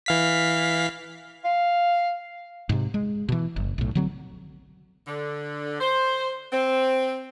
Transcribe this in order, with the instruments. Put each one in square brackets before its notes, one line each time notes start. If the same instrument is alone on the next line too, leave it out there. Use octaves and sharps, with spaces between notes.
[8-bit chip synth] E3 F5 B6
[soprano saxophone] F5
[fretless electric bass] G#2 C3
G#3
B2 E3
F#1
B1 A2
D3 F#3 C4
[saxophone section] D3
C5
C4